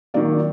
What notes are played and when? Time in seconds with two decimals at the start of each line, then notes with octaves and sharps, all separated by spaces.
0.14 D#3 F#3 A#3 D5